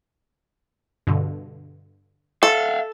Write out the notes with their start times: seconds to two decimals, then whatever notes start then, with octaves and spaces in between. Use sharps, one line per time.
1.07 G2 B2 D3
2.43 A4 E5 F5